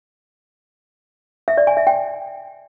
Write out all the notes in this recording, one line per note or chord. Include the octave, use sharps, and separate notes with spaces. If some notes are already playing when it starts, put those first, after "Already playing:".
E5
D5
G#5
E5
G5